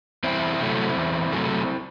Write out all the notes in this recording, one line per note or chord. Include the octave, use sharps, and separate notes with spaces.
E2 C4 E4
C3 F#3 A3
E2
C3 F#3 A3